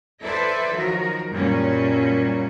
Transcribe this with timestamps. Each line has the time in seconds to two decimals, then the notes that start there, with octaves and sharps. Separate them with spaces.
0.23 E4 A4 B4 C5 D5 E5
0.74 D#3 F3 F#3 F#4 A#4
1.32 F#2 A#2 F#3 G3 C#4